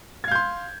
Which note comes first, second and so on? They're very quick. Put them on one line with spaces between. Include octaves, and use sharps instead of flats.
G#6 F5 G6 C6